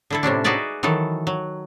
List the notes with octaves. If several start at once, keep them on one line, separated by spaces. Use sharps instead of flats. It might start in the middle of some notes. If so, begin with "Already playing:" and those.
D3 E4 A4
A2 C3 C#4 D4
D#4 F#4 G#4 B4 D5 E5
D#3 E3 F#3 A4
F#3